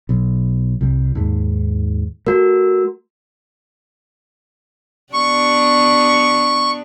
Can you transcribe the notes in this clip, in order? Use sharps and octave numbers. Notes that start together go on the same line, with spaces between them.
B1
C2 G3
D#2 G#2
A3 F#4 A#4
B3 D4 G4 C#6